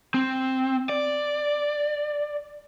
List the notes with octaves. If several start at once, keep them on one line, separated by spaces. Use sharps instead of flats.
C4
D5